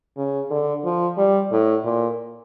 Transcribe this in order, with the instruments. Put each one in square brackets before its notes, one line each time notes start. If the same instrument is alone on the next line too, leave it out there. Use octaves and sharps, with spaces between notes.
[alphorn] C#3
D3
F3
G3
A2
A#2